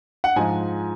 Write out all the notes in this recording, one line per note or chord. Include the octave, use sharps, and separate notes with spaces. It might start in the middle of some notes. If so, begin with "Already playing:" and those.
F#5
G#2 F3 G#3 G#5